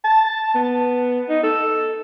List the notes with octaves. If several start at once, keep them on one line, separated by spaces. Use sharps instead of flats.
A5
B3
D#4
A4